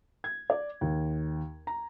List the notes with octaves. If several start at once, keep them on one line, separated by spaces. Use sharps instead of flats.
G#6
D5
D#2
A#5